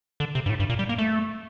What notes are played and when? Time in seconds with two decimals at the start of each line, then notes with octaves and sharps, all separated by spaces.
0.20 D3
0.35 C3
0.46 G2
0.50 A2
0.60 G2
0.70 A#2
0.79 G3
0.89 A#3
0.98 A3